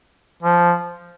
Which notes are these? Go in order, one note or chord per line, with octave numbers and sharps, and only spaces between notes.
F3